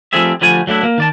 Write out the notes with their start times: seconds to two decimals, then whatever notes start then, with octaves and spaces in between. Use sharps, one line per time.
0.13 F3 G3 A3 C4 G#4 E5
0.41 D3 F3 G3 A3 G#5
0.67 F#3 A3 D4 E4
0.83 A#3
0.98 D#3 D5 A5